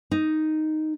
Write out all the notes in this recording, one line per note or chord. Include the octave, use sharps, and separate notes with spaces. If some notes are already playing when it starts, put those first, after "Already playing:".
D#4